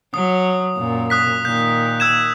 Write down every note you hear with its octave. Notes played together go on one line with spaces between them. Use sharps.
F#3 D#6
F#2 A#2
D#6 F#6 B6
A#2 D#3 G6
E6 G#6 E7